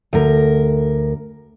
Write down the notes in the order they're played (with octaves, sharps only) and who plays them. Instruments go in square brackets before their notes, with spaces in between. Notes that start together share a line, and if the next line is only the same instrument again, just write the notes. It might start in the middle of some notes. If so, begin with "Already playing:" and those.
[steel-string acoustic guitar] D2 A#4